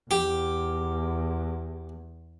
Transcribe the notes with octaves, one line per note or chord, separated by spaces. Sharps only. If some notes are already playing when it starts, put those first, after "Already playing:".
E2 G4